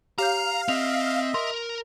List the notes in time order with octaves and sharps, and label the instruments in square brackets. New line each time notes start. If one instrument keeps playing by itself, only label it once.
[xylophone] G4 C#5 G6 [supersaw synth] F5 [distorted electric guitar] A#5
[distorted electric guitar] C4 [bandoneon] D#5 E5 [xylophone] F7
[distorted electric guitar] A#4 [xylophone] C6